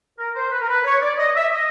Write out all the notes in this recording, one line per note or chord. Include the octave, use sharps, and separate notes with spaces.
A#4
C5
B4
A#4
B4
C#5
D5
D#5
E5
D#5